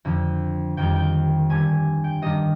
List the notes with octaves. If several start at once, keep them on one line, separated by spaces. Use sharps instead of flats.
F2 D3 F3
F2 D#3 G3 G5
G5
G2 D3 G3 G#5
G5
G2 D#3 G3 D#5